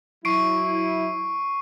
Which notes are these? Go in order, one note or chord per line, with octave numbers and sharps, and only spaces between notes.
F#3 E4 C#6 C7 D7